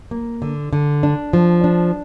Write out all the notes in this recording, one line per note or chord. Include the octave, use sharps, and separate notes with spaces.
A#3
D3
D3
D4
F3
D4